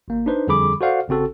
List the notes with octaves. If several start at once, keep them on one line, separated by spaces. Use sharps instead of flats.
G#1 A#3
D4 D#4 B4 C5
F2 D3 G3 G#4 B5 D6
F#4 A4 C5 D5 F5 F#5
G#1 C#3 C4 F#4 A4